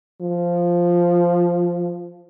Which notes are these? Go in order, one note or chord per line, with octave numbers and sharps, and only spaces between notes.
F3